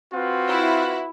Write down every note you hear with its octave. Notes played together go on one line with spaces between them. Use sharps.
C4 F4 F#4 B4
E4